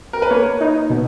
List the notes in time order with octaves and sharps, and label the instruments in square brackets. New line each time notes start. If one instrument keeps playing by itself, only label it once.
[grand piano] A#4
B4
[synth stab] A#3 [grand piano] C#5
[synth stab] D#4
B2